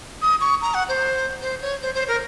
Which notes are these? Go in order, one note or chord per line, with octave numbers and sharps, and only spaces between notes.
D#6
C#6
A#5
F#5
C5
C5
C#5
C5
C5
A#4